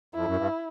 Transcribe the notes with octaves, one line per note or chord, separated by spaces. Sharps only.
F2 E4
F#2
G2